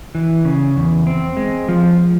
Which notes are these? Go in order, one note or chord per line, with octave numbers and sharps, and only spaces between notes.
E3
C#3
E2
C4
G#3
F3